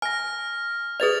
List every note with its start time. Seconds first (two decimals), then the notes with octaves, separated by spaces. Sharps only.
0.02 G#5 F6 A#6
1.00 G#4 B4 D5 D#6 A6 F7